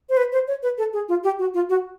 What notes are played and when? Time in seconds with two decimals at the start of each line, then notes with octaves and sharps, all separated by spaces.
0.09 C5
0.17 B4
0.32 C5
0.48 C#5
0.63 B4
0.78 A4
0.93 G#4
1.09 F4
1.24 G4
1.39 F#4
1.54 F4
1.69 F#4